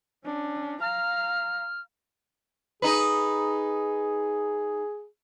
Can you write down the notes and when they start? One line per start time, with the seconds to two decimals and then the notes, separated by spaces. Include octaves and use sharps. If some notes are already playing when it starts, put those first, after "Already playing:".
0.24 C#4 D4
0.81 F5 A#5 F6
2.82 D#4 G#4 B4